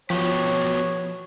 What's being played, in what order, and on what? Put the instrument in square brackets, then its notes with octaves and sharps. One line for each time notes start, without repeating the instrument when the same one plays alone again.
[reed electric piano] F3 [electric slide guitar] B3 F#4 G4 [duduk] C#5